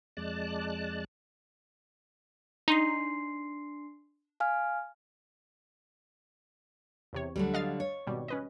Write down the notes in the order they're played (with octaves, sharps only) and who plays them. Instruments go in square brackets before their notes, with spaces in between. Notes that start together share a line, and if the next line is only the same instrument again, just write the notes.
[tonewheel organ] F2 G#3 D5 A5 F#6
[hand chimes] D4 C6 C7 [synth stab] D#4
[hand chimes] F5 G#5 F6
[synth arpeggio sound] E2 C3 C#5
[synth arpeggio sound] D2 [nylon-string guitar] D3 F#3 G3
[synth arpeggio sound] D#5 F5 A6
[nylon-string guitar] C#5
[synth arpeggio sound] G#1 B2 G3
C#4 B4 D#5